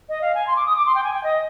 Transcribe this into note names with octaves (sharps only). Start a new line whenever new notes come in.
D#5
F5
G#5
C6
D6
D#6
D6
C6
G5
G#5
G5
D#5